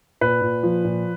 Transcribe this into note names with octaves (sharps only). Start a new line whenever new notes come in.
A#2 B4
A#2
F3
A#2